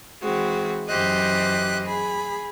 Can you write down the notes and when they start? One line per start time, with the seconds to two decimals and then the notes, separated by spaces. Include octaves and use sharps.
0.22 E3 G#3 C4 F#4
0.89 F#2 E3 G4 C5 D#5 F#6
1.86 G#4 B5